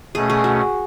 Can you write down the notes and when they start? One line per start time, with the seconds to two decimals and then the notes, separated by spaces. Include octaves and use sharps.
0.15 B2 A3 C#4 G#4
0.30 G#4
0.44 F#4